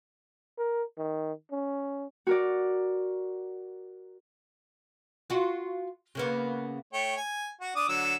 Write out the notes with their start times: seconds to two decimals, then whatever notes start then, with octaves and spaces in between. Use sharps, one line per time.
0.58 A#4
0.98 D#3
1.52 C#4
2.27 F#4 A#4 D5
5.30 F4 F#4
6.15 C#3 A#3 B3
6.93 A3 C#5 G5
7.17 G#5
7.61 F#4
7.76 D4 D6 D#6
7.89 D3 F#3 E6